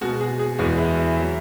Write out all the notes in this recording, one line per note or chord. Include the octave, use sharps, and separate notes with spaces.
B2 G#3 F#4
G#4
G#4
E2 E3 G#3 F#4
E4
E4
E5
F#3